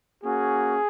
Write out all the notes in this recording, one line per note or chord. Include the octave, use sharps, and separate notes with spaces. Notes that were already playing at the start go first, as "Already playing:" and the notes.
A#3 C#4 F#4 G#4